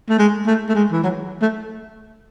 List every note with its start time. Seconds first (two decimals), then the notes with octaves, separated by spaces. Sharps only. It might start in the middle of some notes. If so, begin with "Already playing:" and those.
0.09 A3
0.18 G#3
0.47 A3
0.69 A3
0.75 G#3
0.92 E3
1.03 F#3
1.42 A3